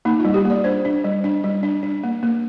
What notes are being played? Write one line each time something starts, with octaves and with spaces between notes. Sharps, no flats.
A#3 D#4
F4
G3
G4
A#3 D5
D4 C5
D4
G3
D4
G3
D4
D4
A#3
A#3